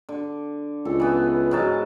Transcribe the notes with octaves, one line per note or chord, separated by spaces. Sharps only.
D3
C#2 A4
E3 B3
G#2 F#3 A5